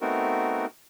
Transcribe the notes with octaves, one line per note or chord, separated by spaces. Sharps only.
A3 B3 C4 D#4 F#4 A#4